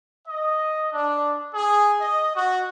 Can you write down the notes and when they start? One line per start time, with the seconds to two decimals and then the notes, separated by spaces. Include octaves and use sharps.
0.26 D#5
0.93 D4
1.54 G#4
1.99 D#5
2.35 F#4